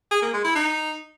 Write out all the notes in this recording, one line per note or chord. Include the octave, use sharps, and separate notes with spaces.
G#4
A#3
G#3
E4
D#4